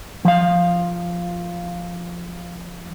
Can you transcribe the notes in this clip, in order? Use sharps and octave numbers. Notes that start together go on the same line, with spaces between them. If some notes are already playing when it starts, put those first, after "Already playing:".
F3 F5